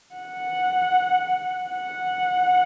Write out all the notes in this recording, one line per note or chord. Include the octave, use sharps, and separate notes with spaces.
F#5
F#5